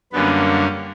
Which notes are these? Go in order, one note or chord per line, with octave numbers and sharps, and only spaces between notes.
F#2 D3 G3 A#3 B3 C#4 B4